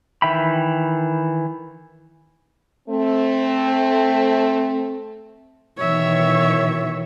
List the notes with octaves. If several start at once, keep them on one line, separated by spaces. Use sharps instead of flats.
D#3 E3 E5 G5 B5
A3 C4
B2 D#3 E3 C#5 E5